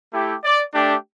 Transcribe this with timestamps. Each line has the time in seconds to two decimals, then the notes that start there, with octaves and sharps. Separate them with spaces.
0.13 A3 E4 G4
0.44 D5
0.74 A3 D4 G4